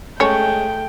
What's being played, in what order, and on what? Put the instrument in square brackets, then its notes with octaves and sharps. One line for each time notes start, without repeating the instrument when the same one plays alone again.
[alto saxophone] G#3 [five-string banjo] A3 [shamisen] C#4 C#5 [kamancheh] G5